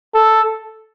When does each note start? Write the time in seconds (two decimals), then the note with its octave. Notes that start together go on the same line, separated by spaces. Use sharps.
0.14 A4